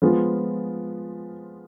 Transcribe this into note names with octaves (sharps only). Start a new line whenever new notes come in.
F3 G#3 B3 F4